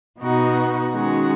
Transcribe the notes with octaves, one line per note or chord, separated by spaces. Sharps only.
B2 B3 D#4 F#4
D#3 G#3 C#4 F#4